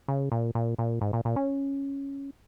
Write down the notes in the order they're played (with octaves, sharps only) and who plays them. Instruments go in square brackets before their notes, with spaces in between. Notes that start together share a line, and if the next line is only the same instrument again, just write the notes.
[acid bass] C#3
A#2
A#2
A#2
G#2
A#2
A#2
C#4